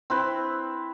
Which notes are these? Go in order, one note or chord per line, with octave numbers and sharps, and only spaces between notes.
C4 E4 B4